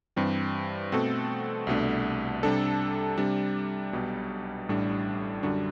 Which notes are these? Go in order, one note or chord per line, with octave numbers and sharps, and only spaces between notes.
G2 E3 G3 C4
B2 A3 C4 F#4 A4
C2 B2 A3 D4
C3 G3 D4 A4
C3 G3 D4
B1 B2 G3
A1 A2 G3 D4
F#2 D3 G3 D4 F#4